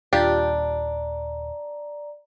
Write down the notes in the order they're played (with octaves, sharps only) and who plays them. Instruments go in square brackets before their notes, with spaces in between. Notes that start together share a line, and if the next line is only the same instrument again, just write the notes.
[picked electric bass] D#1 [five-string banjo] D4 [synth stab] F4 G4 G5 [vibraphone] D5 A#5